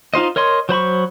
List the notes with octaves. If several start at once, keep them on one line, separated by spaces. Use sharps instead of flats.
D#4 F4 C5 D#5
A#4 C#5 D#5 C6
F#3 C5 B5 C#6